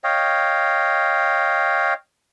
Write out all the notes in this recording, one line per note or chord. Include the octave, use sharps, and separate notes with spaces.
C#5 D#5 F5 G5